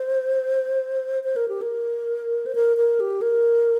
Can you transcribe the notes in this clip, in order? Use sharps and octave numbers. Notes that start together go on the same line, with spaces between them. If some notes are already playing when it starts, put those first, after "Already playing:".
Already playing: C5
C5
A#4
G4
A#4
C5
A#4
A#4
G4
A#4